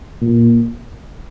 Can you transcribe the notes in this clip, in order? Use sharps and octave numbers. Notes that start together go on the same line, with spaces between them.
A#2